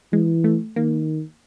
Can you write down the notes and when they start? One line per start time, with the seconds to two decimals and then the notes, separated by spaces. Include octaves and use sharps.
0.12 E3 G#3
0.44 A3
0.76 D#3 A#3